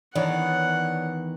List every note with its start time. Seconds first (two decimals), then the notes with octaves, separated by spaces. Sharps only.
0.15 E2 D#3 E3 D4 C#5 F#5